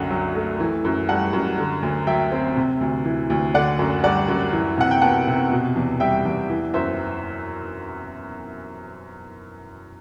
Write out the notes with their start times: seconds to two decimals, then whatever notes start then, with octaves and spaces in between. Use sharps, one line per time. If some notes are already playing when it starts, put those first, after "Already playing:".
Already playing: C2 F#2 D3 F#5
0.10 F#3
0.35 A3
0.60 E3
0.85 F#2
1.09 G3 F#5 A5
1.33 F#2
1.58 D3
1.82 D2
2.07 F#3 E5 G5
2.32 C4
2.56 C3
2.81 D2
3.05 E3
3.30 D2
3.54 D3 D5 F#5
3.79 F#2
4.04 G3 D5 F#5
4.28 F#2
4.53 E3
4.77 C3 F#5
4.91 G5
5.02 B3 F#5 A5
5.27 C3
5.51 B2
5.76 E2
6.00 G3 E5 G5
6.25 E2
6.50 E3
6.74 F#2 C5 E5